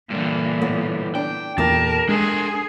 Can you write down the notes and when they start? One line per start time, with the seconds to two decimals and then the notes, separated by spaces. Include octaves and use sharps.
0.10 G2 A#2 D3 E3
0.61 A2 B3
1.15 D4 G5
1.58 E2 A#2 A3 G4 A#4 A5
2.09 G#3 D4 G#4 A#4